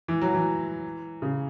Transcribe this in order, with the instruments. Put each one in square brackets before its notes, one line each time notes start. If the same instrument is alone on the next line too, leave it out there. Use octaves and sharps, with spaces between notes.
[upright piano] E3
F#3
E3
C#3